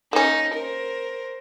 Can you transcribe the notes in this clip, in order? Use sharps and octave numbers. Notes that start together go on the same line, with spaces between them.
A#3 C#4 D#4
A#4 C5